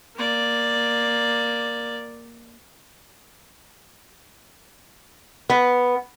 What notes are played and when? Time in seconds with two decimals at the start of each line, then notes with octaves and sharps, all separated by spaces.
0.16 A#3 D5
5.50 B3